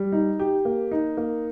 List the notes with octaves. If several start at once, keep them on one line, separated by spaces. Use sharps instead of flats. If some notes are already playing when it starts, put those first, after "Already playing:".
Already playing: G3
D#4
G4
A#3
D#4
A#3